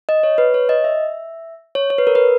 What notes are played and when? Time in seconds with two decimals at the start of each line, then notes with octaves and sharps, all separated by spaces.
0.09 D#5
0.23 C#5
0.38 B4
0.54 C#5
0.69 D#5
0.84 E5
1.75 C#5
1.90 C#5
1.98 B4
2.07 A#4
2.15 B4